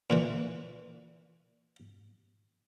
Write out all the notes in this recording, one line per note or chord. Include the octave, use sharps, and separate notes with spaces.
A#2 D3 E3